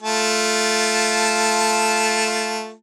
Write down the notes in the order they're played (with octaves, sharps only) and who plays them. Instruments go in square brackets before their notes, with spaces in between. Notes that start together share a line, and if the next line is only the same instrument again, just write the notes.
[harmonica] A3 F4 A5